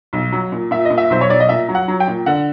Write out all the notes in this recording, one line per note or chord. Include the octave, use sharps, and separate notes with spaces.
B1
F#3
A#2
A#2 E5
D#5
A#2
E5
B1 C5
C#5
B1 D5
D#5
A#2 E5
F#3
F#5
F#3
G5
A#2
D3 F#5